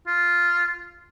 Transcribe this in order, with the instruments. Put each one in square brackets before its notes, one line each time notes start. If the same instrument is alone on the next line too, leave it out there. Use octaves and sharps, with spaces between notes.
[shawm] F4